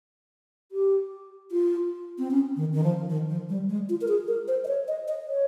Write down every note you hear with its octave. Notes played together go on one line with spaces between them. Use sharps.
G4
F4
C4
C#4
D#3
D#3
F3
D#3
F3
G3
G#3
F4
A#4
G#4
A#4
C5
D#5
C#5
D#5
D#5
C#5